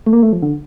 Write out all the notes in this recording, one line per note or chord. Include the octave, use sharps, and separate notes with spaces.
A3
A#3
A3
F3
D3